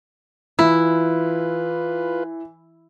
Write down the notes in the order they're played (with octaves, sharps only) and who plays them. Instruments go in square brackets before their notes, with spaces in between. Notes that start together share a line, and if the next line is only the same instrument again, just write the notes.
[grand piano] E3 [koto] E4 [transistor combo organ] F4 B4